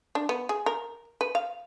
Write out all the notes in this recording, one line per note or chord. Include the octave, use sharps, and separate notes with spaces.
D4
B3
G#4
A#4
B4
F5